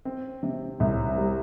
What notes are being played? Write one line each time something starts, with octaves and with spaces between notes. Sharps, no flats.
C4
C3
C2
G3